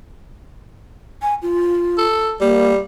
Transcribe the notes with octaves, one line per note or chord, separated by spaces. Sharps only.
G#5
F4
A4
G3 A#3